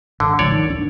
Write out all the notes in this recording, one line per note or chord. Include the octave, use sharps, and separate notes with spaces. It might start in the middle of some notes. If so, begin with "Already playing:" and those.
G#1 D3
G#1 C#2 F3 C#5 D5
D#3
D1 D4